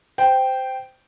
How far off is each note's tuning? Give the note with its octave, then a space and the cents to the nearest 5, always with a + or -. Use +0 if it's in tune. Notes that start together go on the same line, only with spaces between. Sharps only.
C5 -15 G5 -5